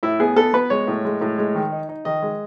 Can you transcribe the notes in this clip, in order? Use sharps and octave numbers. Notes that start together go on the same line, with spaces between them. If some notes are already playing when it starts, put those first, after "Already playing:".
A2 E4
B3 G#4
B3 A4
B3 B4
G#3 C#5
A2
G#3
A2
G#3
D#3
D#4
D#4
D#3 D#5
G#3